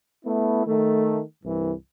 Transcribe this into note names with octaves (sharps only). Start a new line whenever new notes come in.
A3 B3 E4
D#3 A3
C2 G2 E3